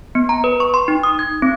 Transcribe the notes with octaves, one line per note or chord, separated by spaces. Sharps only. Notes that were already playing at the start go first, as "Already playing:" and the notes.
B3
A#5
B4
C#6
C6
D#4
D#6
G#6
C4